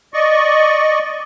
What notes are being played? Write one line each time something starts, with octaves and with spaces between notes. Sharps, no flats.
D5 D#5 C#6